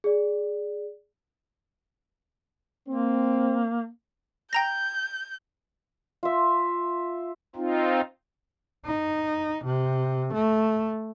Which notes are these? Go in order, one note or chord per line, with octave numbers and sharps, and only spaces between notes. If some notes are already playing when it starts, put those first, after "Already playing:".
G#4 D5
A#3 C4
G5 A#5 G6 A#6
F4 E5
C4 D#4 F4
D#4
C3
A3